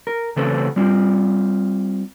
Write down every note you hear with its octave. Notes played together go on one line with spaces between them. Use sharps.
A#4
C#3 E3 A3 C4 A4 B4
G3 C4 F4